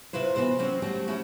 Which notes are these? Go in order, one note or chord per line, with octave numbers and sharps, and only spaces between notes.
C3 E4 F4 B4 C5
E3 B3 F#4 C5
F#3 C4 C#4 F#4
F#3 G3 A3 F#4
A3 C#4 E4 F#4